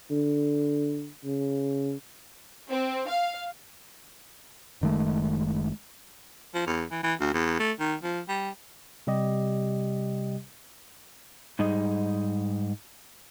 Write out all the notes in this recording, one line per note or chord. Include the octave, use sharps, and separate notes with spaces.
D3
C#3
C4
F5
F#1 D#3 G#3 A3
F3
E2
E3
E3
D2
E2
A3
D#3
F3
G3
C3 G3 G4 D#5
G#2 G3 D#4 G#4 D#5